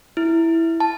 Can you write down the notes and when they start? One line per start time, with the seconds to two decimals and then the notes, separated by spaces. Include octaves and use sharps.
0.17 E4
0.80 A5